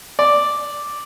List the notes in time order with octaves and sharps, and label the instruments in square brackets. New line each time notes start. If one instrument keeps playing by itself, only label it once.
[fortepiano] D5